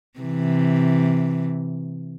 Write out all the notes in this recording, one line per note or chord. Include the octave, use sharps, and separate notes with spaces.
C3 E3